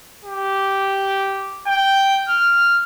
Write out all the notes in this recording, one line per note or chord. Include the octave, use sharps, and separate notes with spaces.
G4
G5
F6